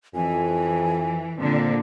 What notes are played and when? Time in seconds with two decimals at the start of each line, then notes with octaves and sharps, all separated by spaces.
0.15 F2 E3 G#5
1.39 A#2 D3 C4